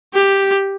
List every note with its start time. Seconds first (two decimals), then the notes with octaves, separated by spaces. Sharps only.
0.14 G4